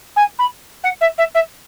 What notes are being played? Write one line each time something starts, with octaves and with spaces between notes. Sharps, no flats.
G#5
B5
F#5
E5
E5
E5